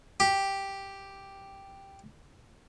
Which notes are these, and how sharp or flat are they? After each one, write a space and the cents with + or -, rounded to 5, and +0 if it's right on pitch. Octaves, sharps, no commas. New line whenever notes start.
G4 +0